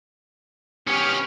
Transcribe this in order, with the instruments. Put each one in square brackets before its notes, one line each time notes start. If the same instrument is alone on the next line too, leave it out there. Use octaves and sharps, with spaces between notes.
[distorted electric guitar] B3 C#4 [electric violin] G4 F6